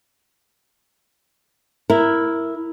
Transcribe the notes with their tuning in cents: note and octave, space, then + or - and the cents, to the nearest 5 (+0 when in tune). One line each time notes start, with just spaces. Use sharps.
E4 +0 A#4 +0